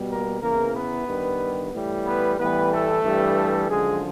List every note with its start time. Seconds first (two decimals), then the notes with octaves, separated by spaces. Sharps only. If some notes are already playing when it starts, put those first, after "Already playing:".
Already playing: B2 G3
0.10 A#3 A#4
0.42 E2 C#3 E3 A#3 A#4
0.74 B3 B4
1.07 G2 D#3 G3
1.73 A2 E3 G3
2.05 B3 B4
2.38 A2 E3 G3 B3 B4
2.70 A3 A4
3.03 G2 E3 G3
3.68 F#2 D3 F3 G#3 G#4